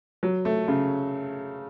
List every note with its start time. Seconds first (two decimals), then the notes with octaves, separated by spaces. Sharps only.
0.23 F#3
0.45 A3
0.68 C#3